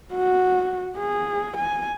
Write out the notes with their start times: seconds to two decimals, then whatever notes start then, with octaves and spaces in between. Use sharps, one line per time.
0.13 F#4
0.98 G#4
1.57 G#5